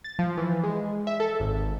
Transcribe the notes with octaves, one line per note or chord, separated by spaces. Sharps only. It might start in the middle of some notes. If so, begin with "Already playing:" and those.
A6
F3
E3
G#3
E5
A4
G#1